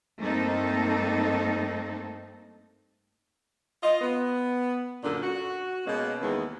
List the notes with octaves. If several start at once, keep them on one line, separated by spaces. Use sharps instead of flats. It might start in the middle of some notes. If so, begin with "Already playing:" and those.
G2 A3 A#3 C4 D#4 A4
F4 D#5
B3
F#2 A#2 D3 A#3 D4
F#4
B2 G#3 A#3 B3 C#4
D#2 E3 G#3 B3